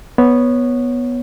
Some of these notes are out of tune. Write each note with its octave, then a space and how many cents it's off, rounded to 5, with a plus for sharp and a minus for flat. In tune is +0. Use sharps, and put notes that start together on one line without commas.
B3 -5 C#5 +0